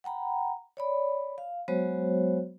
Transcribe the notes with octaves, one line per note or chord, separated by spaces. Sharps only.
F#5 G5 A#5 B5
C#5 D5 B5
F5
F#3 G#3 B3 F#4 C5 C#5